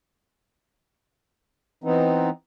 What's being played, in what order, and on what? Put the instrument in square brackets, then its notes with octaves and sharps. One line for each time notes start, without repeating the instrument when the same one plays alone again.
[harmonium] E3 B3 C4 D#4